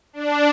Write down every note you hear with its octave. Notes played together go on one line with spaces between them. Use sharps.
D4